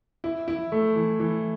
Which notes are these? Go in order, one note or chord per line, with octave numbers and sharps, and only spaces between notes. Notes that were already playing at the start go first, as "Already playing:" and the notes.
E4
E4
A3
E3
E3